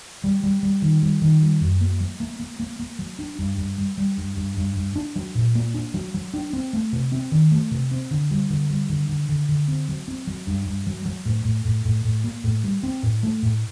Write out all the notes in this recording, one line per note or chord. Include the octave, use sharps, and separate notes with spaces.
G3
G3
G3
D#3
G3
D#3
G3
F#2
A#3
F#3
A#3
A#3
A#3
A#3
F#3
D4
G2
G2
G3
G3
G2
G2
G2
G2
D4
F#3
A#2
A#3
D4
F#3
F#3
D4
C4
A3
C3
C4
D#3
A3
C3
C4
D3
G3
D3
G3
D3
D3
D3
D3
C4
F#3
C4
F#3
G2
G2
F#3
F#3
A2
A2
A2
A2
A2
A#3
A2
G3
C4
A2
A3
A2